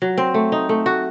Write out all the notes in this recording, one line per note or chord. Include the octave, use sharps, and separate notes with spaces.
F#3
C4
A3
D#4
A3
F#4